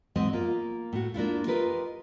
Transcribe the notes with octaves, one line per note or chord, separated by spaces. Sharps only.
E2 G#2 G#3 C4 D#5
A#3 F4
A2 F#4
A#3 D4 E4 F4
F4 G4 A#4 B4 D#5